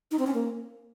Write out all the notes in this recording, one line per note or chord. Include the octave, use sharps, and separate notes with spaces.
D#4
C4
C#4
A#3